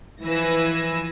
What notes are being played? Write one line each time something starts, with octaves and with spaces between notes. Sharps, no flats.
E3 F3 B4 G#5 E6 A#6